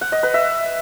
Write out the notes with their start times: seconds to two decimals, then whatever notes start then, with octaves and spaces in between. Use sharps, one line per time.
0.01 F#5
0.12 D#5
0.23 B4
0.34 E5